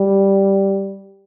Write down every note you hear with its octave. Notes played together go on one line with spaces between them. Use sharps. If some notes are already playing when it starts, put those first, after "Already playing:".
Already playing: G3